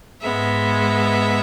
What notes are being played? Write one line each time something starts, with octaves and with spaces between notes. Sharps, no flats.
G#2 G#3 B3 E5